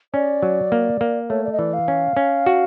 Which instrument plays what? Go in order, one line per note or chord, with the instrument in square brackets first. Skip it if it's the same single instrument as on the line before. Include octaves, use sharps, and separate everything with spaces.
[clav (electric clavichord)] C#4 [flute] D5
[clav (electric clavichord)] F#3
A#3
A#3
[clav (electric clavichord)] A3 [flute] C#5
[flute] D5
D#5
[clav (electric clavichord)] E3 [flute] D5
[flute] F5
[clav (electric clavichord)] C#4
C#4
F#4